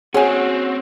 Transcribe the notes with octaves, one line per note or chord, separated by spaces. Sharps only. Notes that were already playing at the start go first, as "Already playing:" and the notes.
C4 C#4 F#4 G#4 C#5 F#5 G#5